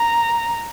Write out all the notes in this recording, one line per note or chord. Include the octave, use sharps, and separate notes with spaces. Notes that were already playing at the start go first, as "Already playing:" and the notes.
Already playing: A#5